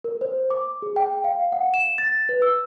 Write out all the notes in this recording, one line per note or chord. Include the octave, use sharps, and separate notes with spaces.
A#4
C5
D6
G#4
G5
F5
F#5
E7
A6
B4
E6